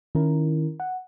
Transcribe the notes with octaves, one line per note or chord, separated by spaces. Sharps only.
D#3 C#4 E4 A#4
F#5